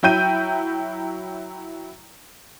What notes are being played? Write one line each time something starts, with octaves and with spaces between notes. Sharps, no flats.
F#3 E4 G5 G6 D#7